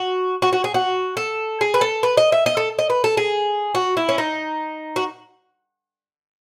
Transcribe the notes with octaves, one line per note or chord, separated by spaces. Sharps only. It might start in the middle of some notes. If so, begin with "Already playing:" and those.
Already playing: F#4
F#4
F#4
G#4
F#4
A4
G#4
B4
A4
B4
D#5
E5
D#5
A4
D#5
B4
A4
G#4
F#4
E4
C#4
D#4
F#4